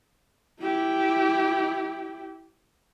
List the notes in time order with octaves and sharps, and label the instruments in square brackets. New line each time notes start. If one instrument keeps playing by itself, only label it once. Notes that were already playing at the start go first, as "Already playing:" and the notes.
[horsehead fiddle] E4 G4